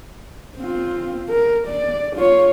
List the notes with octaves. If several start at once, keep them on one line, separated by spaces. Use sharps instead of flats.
C4 F4
A#4
D5
F4 C#5